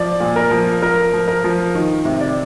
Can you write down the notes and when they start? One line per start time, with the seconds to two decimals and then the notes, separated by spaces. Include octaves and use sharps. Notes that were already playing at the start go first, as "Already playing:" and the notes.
Already playing: F3 D5
0.20 A#2
0.36 A#4
0.51 F3
0.82 F3 A#4
1.14 F3
1.28 A#4
1.44 F3
1.75 D#3
2.05 C3
2.20 D5